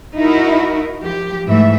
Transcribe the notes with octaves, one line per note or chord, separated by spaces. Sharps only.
D#4 E4 F#4 A#4
F3 G4
G#2 E3 A3 E5